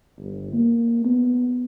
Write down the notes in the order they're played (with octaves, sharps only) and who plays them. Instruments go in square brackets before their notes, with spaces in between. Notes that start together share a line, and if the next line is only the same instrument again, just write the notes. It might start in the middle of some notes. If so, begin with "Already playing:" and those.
[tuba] G1
A#3
B3